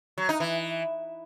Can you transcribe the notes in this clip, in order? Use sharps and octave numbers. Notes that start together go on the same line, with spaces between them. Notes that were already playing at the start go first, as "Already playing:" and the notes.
F#3
D#4
E3